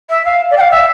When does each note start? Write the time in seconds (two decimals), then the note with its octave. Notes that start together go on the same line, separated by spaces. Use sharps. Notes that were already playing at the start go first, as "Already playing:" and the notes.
0.09 E5
0.25 F5
0.51 D5
0.57 G5
0.61 F5
0.71 E5